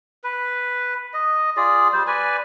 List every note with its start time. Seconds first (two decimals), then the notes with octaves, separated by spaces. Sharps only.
0.24 B4
1.13 D#5
1.57 F4 G#4 D5
1.93 G3 C5
2.07 B4 D5 G#5